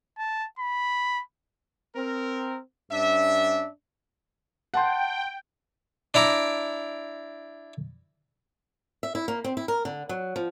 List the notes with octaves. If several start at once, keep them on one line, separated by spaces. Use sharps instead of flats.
A5
B5
C4 A#4
G2 C#4 D4 E5
F#5 G5 A5 C6
D4 E4 A#5 D6
E5
E4
A#3
C4
E4
A#4
D3
F#3
F3